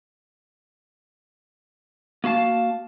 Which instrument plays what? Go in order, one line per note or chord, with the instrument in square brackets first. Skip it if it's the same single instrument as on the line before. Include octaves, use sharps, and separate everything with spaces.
[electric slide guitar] A#3 F#4 F5 A5